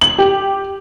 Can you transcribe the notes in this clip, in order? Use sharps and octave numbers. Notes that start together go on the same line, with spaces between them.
F#7
G4